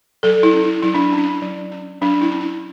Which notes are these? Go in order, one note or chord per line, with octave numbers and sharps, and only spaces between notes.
F#3 A4
E4
C#4
E4
F#3 E4
D4
C#4
D4
F#3
C#4
F#3 D4
E4
C#4
E4